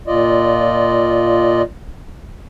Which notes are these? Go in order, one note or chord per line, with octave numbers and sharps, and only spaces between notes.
A#2 F4 D5 D#5